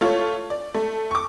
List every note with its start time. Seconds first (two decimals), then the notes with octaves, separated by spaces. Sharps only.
0.01 A3 F4 C#5
0.50 D5
0.74 A3
1.11 C#6 D6